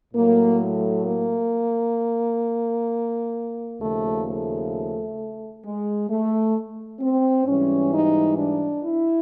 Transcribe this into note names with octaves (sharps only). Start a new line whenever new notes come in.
A2 F#3 A#3
A3
A#3
D#2 C#3 F3 A3
A3
G#3
A3
C4
G#2 E3 G3 C#4
D#4
D4
E4